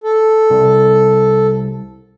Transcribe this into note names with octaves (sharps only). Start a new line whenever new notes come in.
A4
C2